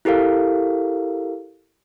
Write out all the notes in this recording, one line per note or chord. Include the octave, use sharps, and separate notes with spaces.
E4 G4 A4 A#4 F5